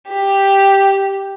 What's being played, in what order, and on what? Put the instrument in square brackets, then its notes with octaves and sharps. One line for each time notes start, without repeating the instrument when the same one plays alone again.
[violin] G4